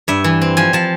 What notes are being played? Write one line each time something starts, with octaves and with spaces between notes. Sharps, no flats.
G2 E5
E3
C4
F3 G#5
F3 A5